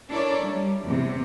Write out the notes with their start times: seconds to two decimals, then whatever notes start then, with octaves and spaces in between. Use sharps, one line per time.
0.10 D4 E4 A4 A#4 C#5 D5
0.43 G3
0.86 E2 C3